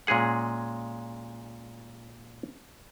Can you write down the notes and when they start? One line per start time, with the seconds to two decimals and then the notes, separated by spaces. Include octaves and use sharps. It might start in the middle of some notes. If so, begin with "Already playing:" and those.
0.07 A#2 G#3 C#4 G#4 F#5